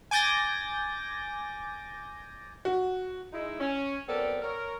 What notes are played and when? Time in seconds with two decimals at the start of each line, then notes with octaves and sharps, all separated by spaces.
0.11 G#5 D6 G6 A6 A#6
2.65 F#4
3.33 G#3 D#4 E4
3.60 C#4
4.08 F#3 B3 C4 A4 A#4 D5
4.42 A#4 C#5